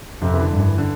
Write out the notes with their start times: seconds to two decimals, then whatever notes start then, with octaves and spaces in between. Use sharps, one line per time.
0.21 F2 C3
0.34 E3
0.41 D3
0.51 G2
0.60 E3
0.78 D3